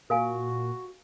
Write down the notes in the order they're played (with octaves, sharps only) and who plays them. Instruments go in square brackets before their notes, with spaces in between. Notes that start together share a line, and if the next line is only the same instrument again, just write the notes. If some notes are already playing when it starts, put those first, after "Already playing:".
[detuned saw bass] A#2 [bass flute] F#4 [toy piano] A#4 F5 G#5